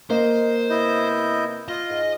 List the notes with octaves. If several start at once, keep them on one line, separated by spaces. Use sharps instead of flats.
A#3 C5 D#5
C3 B3 E4 D#5 G6
F4 D#5
G#2